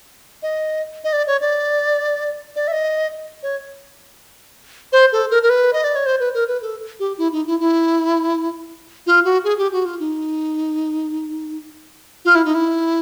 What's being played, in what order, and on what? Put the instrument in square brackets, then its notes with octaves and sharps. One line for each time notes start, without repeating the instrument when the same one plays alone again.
[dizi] D#5
D#5
D5
C#5
D5
D5
E5
D#5
C#5
C5
A4
A#4
A#4
B4
D#5
D5
C#5
C5
B4
A#4
B4
A4
G4
E4
D#4
E4
E4
F4
F#4
G#4
G4
F#4
F4
D#4
F4
E4
D#4
E4